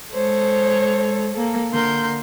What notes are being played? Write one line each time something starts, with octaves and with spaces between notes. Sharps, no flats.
G#3 A4 C5 C#5
A#3 A4
D3 A#3 A#4 C6 G6